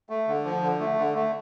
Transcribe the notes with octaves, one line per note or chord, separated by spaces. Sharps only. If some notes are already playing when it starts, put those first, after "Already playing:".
A3
D3
F3
D3
A3
D3
A3